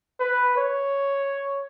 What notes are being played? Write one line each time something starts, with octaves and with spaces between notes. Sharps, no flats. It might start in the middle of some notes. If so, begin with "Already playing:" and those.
B4
C#5